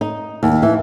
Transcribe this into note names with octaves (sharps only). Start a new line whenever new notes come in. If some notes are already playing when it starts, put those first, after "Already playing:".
D#4
D#2
E3